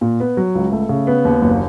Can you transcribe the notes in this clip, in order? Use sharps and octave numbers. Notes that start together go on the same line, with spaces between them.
A#2
B3
F#3
C#2
A3
C#3
B3
D#2
F#1